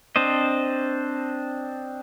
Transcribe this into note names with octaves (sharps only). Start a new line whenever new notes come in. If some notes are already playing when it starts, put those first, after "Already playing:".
C4 D4 C5 D#5